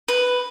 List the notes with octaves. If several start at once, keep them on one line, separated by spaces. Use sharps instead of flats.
B4